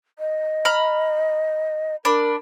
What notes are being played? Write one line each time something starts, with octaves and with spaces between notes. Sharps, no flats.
D#5
A#5 B5 F6
D4 A#4 B5